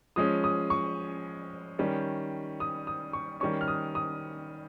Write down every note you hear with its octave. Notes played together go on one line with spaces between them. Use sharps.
F3 G#3 C#4 D#6
D#6
C#6
D#3 G3 C#4
D#6
D#6
C#6
D#3 G3 C#4 C#6
F6
D#6
D#6